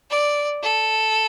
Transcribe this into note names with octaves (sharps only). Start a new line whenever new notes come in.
D5
A4